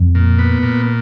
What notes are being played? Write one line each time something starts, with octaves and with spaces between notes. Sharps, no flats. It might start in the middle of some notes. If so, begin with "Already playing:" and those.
Already playing: F2
A#2
B3
A#2